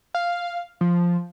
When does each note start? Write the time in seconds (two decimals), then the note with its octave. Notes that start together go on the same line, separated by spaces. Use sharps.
0.15 F5
0.81 F3